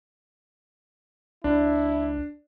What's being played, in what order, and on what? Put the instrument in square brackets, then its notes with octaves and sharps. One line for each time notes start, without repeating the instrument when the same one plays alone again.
[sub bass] C#2 [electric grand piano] D4 [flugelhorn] E4